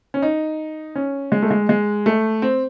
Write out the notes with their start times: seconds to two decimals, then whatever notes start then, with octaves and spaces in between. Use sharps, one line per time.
0.14 C#4
0.22 D#4
0.95 C#4
1.32 G#3
1.42 A3
1.51 G#3
1.69 G#3
2.06 A3
2.42 C4